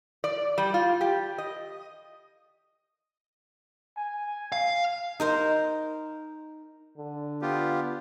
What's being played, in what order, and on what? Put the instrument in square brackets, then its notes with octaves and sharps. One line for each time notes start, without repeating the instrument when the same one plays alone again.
[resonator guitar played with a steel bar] D5
G3
F4
G4
D#5
[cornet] G#5
[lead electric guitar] F5
[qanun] D#4 A#4 C5
[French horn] D3
[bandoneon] B3 F4 G4